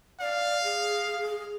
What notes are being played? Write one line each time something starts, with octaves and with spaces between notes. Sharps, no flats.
D5 F5
G#4